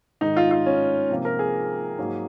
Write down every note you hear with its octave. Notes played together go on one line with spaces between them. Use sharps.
G#2 D#3 G#3 D#4
F4
F4
C#4
C3 F3 A#3
A#4
G#4
G#2 F#3 A#3